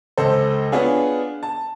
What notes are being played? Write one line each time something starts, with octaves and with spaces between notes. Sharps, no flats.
C#2 A4 C5
B3 D4 F4 G#4 C#5
A5